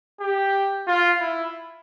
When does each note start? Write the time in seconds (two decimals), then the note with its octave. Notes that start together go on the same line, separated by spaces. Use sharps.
0.20 G4
0.87 F4
1.20 E4